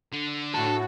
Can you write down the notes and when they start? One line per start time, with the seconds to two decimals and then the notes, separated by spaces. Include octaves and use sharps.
0.12 D3
0.54 A2 F#4 A4